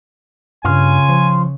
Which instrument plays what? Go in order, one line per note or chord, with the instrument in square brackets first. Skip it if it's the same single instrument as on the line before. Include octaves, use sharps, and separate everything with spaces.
[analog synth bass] G2 [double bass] C#3 [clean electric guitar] F4 [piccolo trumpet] G#5
[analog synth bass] F3